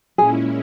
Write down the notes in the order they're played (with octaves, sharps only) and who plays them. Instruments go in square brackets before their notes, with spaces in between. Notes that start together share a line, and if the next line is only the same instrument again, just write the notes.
[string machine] A#2 G#3 C#4 E4 [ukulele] G#4